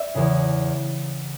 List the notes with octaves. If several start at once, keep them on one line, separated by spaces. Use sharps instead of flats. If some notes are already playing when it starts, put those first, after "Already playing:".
Already playing: D5 E5
E2 C#3